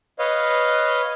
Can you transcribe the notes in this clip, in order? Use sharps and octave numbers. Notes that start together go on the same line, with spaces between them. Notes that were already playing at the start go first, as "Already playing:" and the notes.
B4 C#5 D#5 F5